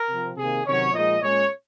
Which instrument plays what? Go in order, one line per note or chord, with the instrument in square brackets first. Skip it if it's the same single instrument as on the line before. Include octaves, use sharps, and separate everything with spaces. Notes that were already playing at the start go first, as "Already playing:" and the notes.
Already playing: [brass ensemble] A#4
C3 F3 C4
C3 D#3 A#3 G#4
C3 D#3 F#3 C#4 C#5
A#2 F3 G#3 D#4 D#5
A#2 G#3 C#4 C#5